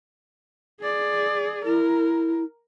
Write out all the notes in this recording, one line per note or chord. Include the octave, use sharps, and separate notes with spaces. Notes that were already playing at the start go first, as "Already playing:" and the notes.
G#4 D5
E4 A#4